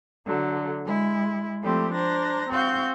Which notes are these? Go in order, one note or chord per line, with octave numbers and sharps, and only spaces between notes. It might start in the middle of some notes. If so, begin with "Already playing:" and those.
D3 F#3 A3
G#3 E4
F3 G3 A3 C4 G4
D4 C5 A#5 A#6
C4 F#4 F5 G6